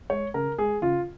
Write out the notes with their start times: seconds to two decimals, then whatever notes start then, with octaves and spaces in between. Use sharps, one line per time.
0.10 G#3 C#5
0.34 C#3 A#4
0.58 G#3 G#4
0.82 C#3 F4